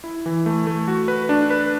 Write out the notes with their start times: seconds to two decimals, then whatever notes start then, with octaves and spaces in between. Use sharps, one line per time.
0.04 E4
0.26 E3
0.46 A3
0.67 A3
0.88 F#4
1.08 B4
1.29 D4
1.50 B4